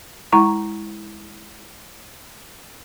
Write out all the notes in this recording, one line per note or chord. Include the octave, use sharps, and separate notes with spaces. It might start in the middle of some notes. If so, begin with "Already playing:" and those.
G#3 E4 A#5 C#6